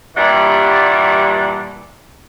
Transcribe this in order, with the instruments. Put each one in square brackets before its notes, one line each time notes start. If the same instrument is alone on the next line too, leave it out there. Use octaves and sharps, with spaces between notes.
[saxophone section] G2 A#2 E3 G3 F#5